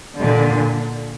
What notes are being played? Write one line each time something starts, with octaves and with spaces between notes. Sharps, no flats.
A#2 D3